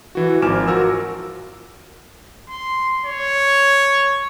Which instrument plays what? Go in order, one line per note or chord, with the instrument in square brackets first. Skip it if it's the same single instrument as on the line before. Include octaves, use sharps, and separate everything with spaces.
[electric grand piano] E3 F#4
G#1 F3 G#5 D6 F6 E7
F4 F#4 A#4 E6
[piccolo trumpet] C6
C#5